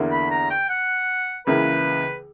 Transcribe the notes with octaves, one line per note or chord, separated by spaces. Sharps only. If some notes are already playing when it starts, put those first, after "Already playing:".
Already playing: E2 D3 A#3 E4
B5
A#5
G5
F#5
C#2 C#3 E3 A#3 E4 B4